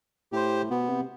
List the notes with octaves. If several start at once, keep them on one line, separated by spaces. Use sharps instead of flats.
A2 G4 C5
B2 B3
C3